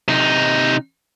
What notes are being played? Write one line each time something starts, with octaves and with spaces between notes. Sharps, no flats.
C3 D#4